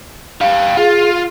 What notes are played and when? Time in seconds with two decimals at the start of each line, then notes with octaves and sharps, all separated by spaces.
0.41 G4 F5
0.77 F4 G#4